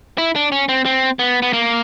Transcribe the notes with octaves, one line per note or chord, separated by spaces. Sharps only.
E4
D4
C#4
C4
C4
B3
B3
A#3